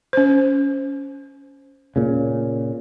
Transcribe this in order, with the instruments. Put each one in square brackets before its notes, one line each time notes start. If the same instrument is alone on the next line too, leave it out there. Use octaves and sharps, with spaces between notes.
[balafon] C#4 C5
[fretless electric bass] A#2 C#3